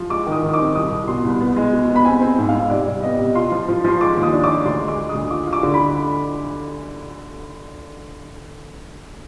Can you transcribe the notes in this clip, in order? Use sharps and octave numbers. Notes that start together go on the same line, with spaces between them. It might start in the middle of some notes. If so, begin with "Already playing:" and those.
Already playing: F3
G#3 D6
D#3
D#6
D#3
D6
C4
C2 D#6
C2
B2 C6
C2
B3
G#3
B2
B3
B5
C4 G#5
C4
G#2
F5
G#2
C3 D5
G3
B3 D#5
C3
F4 C6
F3
F3
F3 C6
G#3 D6
D#2
D#6
D4
D6
D4
D2 C6
G#3
D6
G#3
D#6
D2
F4 D6
F4
D6
D3
B5